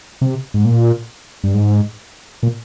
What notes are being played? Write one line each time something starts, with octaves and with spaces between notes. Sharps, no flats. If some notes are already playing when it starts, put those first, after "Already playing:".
C3
G#2
A#2
G2
G#2
A#2